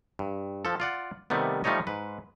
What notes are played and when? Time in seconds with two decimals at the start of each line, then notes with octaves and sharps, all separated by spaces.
0.19 G2
0.65 F3 A4
0.80 F4 D5 F#5
1.30 C3 D#3 G3 A3 B3
1.64 F3 G3 A3 D#4 C#5 D#5
1.87 G#2 B4